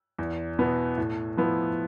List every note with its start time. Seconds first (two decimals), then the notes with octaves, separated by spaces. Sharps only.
0.19 E2
0.59 B2 B3 E4
0.97 A2
1.37 F3 B3 E4